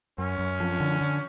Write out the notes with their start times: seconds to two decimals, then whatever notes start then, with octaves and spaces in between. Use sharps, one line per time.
0.18 F#2 C#4
0.39 F#2
0.60 F3
0.80 D3
1.01 D3